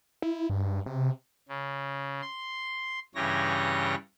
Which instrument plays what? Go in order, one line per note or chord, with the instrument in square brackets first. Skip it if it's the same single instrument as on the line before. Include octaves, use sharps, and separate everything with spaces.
[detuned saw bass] E4
G2
C3
[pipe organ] C#3
C6
G2 C#3 E3 G3 C#5 A#6